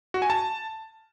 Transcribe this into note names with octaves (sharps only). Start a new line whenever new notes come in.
F#4
G#5
A5